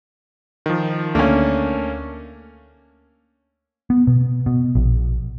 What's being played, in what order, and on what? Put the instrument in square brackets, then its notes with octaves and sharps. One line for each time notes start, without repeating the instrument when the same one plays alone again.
[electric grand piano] D#3 F3
[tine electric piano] D2 [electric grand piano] A3 D4 [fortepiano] A#3 C#4
[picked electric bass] B3
B2
B2
A#1